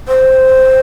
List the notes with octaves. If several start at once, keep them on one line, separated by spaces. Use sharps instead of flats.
C5